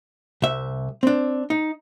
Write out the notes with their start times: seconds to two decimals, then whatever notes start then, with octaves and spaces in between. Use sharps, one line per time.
0.42 C2 E5
1.03 C4 D4
1.50 D#4